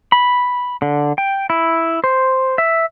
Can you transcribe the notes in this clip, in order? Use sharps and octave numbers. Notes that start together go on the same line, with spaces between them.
B5
D3
G5
E4
C5
E5